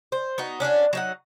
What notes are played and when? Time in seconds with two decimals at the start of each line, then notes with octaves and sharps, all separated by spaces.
0.12 C5
0.38 B3 D#4 F#4
0.60 C#4 D4 E4 F#4
0.93 F#3 D#4 F#5